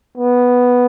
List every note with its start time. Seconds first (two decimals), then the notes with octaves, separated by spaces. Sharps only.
0.18 B3